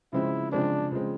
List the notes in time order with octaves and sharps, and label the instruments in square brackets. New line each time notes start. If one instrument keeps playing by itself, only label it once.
[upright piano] C#3 F3 G#3 C4 [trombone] E4
[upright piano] C#3 F3 G#3 C4 [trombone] D4
[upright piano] C#3 F3 G#3 C4